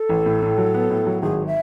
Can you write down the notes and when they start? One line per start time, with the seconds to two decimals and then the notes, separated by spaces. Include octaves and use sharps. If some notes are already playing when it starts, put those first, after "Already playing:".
Already playing: A4
0.09 A1
0.26 A2
0.42 A2
0.58 F#3
0.74 B3
0.90 A2
1.07 F#3
1.22 G#1 G#4
1.46 E5